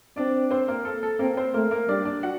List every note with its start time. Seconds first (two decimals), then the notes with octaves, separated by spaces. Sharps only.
0.16 C4 D4 D5
0.51 C4 C5
0.68 A#3 A#4
0.85 A4
1.03 A4
1.19 A#3 C4 A#4
1.37 C4 C5
1.54 A3 A#3 A#4
1.71 A#3 A#4
1.88 G3 D4 D5
2.05 D4 D5
2.23 F#4 F#5